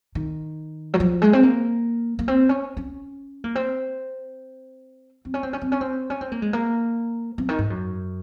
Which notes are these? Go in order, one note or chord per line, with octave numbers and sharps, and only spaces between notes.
D#3
F#3
F3
G#3
C4
A#3
A#3
C4
C#4
C#4
A#3
C4
C4
C#4
C4
C#4
C4
C#4
C4
C#4
C4
A#3
G#3
A#3
C4
C#3
D#3
G#2
F#2